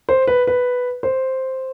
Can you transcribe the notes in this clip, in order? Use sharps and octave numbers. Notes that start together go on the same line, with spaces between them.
C5
B4
B4
C5